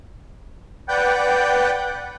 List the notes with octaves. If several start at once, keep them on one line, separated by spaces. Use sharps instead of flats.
B4 D5 F#5 G5 G6